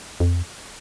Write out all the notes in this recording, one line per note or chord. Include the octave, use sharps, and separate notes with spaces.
F2